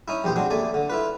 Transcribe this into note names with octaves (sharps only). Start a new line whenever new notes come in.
C#4 D#4 E4
A#1 E2 G4 C5
F#3 G#3 C4 D4
D#2 A3 D5 G#5
D3
E4 F4 B4